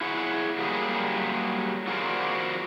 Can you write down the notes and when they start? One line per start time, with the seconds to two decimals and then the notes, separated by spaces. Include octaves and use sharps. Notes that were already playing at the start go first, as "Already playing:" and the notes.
0.01 E4 G#4 C#5 F#5
0.58 F#3 G3 A#3 G4 G#4
1.87 F4 F#4 G#4 A#4 C5 D5